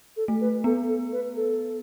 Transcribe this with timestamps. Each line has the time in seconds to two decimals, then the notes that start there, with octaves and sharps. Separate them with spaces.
0.17 A4
0.28 A3
0.41 B4
0.64 B3 A4
0.88 A4
1.12 B4
1.36 A4